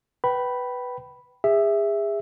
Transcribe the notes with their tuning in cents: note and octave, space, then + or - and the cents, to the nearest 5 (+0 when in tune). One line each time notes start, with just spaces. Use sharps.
B4 +0 G5 -25 B5 +0
G#4 -30 E5 +0